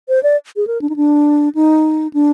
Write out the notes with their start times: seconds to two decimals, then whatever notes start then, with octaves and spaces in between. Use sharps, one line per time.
0.09 C5
0.23 D5
0.56 G#4
0.67 A#4
0.81 D4
0.89 D#4
0.96 D4
1.55 D#4
2.13 D4